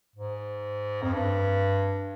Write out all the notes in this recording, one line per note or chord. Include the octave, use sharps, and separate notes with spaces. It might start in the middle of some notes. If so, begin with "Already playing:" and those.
G#2
F2
G2